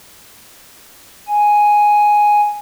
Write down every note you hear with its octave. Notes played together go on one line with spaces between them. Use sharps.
G#5